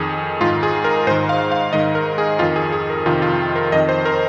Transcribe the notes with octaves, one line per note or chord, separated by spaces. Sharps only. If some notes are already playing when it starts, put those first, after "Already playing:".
Already playing: F2 D#3 G#4
G#2 D#3 F4
G#4
A#4
G#2 D#3 C5
F5
F5
G#2 D#3 D#5
A#4
G#4
F2 D#3 F4
G#4
G#4
A#4
F2 C3 D#3 F4
F4
A#4
F2 D#3 D#5
C5
A#4